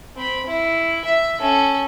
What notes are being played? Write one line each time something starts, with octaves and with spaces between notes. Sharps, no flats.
C4 B5
E4
E5
C#4 A4